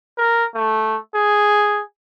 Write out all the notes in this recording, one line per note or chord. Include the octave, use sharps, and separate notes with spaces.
A#4
A3
G#4